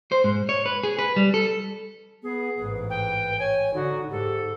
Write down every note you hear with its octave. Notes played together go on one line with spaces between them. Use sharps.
C5
G#2
C#5
B4
G#4
B4
G3
A4
B3 G#4
A1 G#2 B4
G5
C#5 G#5
D3 D#4 F#4
G#2 G4 A4